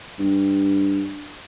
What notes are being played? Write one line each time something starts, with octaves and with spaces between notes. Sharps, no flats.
G2